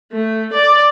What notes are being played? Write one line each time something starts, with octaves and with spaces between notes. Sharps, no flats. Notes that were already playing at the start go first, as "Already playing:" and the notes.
A3
D5